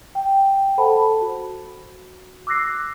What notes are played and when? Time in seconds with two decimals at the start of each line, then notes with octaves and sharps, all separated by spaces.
0.15 G5
0.78 A4 C5 F#5 A5 B5
1.21 F#4
2.47 D6 E6 F#6 A#6 C7